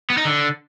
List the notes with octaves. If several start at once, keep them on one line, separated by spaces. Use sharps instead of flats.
B3
D#4
D3